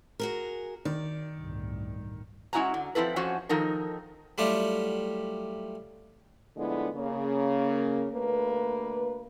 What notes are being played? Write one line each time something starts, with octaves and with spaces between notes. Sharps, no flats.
F#4 G#4 A#4
D#3 D5
G1 C2 A2
G#3 C#4 E4 F#4 G#5 A#5
D3
F3 C4 E4 A4 B4
F2 C#4 F#4 C5
D#3 F3 D#4 A4 A#4
F#3 G3 A3 E4 F4 G4
D3 F3 G#3 A3 B3 E4
C#3 A#3
D2 A3 A#3 B4